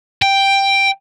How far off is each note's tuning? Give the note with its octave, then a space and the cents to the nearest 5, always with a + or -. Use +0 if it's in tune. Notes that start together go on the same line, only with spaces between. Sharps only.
G5 +5